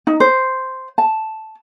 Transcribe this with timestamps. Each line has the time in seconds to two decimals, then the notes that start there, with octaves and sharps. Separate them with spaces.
0.07 D#4
0.20 C5
0.98 A5